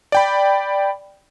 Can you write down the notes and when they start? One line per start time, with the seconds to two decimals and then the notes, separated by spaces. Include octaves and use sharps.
0.12 D5 G5 B5